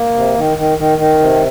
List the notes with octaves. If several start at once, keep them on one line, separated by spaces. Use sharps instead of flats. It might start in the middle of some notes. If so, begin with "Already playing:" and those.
Already playing: A#3
C3
D#3
D#3
D#3
D#3
C3